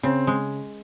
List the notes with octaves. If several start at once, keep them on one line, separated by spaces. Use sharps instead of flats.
C#3 C4
G#3